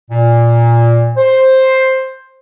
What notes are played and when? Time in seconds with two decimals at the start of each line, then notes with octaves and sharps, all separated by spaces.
0.11 A#2
1.17 C5